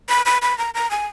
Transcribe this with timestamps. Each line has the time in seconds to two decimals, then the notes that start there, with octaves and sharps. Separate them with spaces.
0.09 B5
0.26 B5
0.42 B5
0.58 A#5
0.74 A#5
0.91 G#5